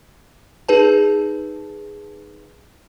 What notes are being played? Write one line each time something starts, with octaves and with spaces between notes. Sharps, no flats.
D#4 G#4 B4 A5